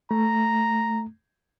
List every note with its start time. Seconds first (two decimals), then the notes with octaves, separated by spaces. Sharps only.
0.11 A3 A#5